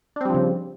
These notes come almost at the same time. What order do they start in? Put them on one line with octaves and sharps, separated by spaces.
D4 C4 G3 F3 C#3